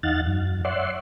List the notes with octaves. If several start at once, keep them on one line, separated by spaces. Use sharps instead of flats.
E2 D#4 F5 F#5 A6
F#2
C#5 D5 E5 F#5 C6